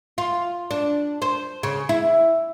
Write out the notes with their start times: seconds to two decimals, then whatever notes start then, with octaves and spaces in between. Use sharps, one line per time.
0.18 F4
0.71 D4
1.22 C5
1.63 C#3
1.89 E4